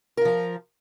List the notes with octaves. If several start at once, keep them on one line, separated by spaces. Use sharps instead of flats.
F3 F4 A#4